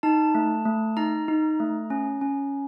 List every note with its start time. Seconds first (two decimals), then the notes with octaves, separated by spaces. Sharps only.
0.03 D#4 A5
0.35 A3
0.65 A3
0.97 D#4 A#5
1.28 D#4
1.60 A3
1.90 C#4
2.21 C#4